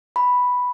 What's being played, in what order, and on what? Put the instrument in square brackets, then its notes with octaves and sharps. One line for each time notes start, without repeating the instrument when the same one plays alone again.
[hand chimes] B5